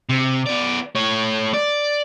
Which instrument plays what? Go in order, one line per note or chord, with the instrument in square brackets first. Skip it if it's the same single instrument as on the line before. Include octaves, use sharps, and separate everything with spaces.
[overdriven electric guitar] C3
B3 D5
A3 C#5
D5